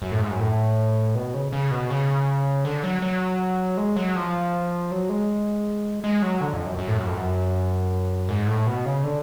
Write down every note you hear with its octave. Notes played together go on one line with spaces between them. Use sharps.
F#2
A2
G#2
F#2
A2
B2
C#3
C#3
B2
C#3
D3
F#3
F#3
G#3
F#3
F3
F#3
G#3
G#3
F#3
D3
F2
F#2
F#2
A2
F#2
F2
F#2
G#2
A2
B2
C#3
D3